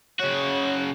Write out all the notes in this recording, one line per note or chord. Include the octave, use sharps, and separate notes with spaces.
C#3 F#4 C#5